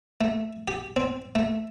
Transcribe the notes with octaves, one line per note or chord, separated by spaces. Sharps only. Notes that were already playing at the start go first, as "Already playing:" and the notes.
A3
G4
C4
A3